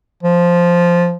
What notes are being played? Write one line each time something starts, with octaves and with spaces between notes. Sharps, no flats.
F3